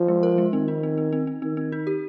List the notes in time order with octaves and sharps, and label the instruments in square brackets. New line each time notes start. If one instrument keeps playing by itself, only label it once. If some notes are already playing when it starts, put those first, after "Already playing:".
Already playing: [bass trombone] F3
[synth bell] G#3
A#4
G#3
[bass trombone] D#3 [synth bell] C4
[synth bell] D#4
C4
C4
C4
C4
[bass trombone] D#3 [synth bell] C4
[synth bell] C4
D#4
G4